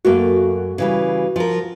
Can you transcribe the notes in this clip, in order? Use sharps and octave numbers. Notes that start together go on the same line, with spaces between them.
F#2 A3 A#3 F#4
C#3 E3 G3
F3 A#4